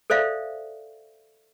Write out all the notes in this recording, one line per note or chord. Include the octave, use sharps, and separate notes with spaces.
A4 C5 D5 E5 F5